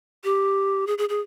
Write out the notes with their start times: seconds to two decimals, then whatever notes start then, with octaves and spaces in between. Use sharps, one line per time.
0.24 G4
0.87 G#4
0.98 G#4
1.09 G#4